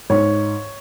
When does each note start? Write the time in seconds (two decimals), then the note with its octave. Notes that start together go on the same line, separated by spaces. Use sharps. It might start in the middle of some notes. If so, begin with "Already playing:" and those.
0.10 G#2 C#5